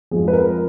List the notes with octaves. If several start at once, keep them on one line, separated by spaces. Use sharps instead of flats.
F2 F3 G#3 G#4
B4
A#4